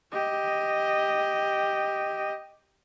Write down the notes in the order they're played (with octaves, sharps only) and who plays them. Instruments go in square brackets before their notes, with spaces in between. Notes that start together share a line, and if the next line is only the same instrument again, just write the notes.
[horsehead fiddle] G4 D#5